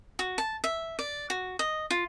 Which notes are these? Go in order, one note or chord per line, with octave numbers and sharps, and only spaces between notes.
F#4
A5
E5
D5
F#4
D#5
F4